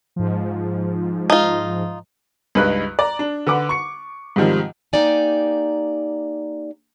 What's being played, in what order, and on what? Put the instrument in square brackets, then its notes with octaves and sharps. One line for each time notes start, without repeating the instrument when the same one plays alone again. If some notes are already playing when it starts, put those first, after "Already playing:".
[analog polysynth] G#2 F3
[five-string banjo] D#4 F4
[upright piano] C#2 G2 D#4 B4 B5 F#6
D5 A#5
D4
D3 B4 F#5 D6
C#6 C#7
G#2 C3 D#3 F3 G3
[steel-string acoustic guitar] A#3 D#4 G4 D5 G#5